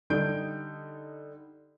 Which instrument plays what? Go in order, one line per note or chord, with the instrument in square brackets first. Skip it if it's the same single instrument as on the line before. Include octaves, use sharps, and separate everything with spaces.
[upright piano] D3 G3 D#4 G6 D7